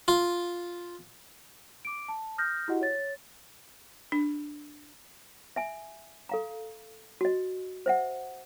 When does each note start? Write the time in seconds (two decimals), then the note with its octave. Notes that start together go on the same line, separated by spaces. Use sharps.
0.08 F4
1.85 D6 D7
2.08 A5
2.38 D#6 F6 G6 A#6
2.68 E4 F#4 G4 D#5 F#5
2.81 C#5 A6
4.12 D4
5.56 E5 G#5
6.29 A4 F5 A#5
7.21 F#4 D#5
7.86 C5 E5 F#5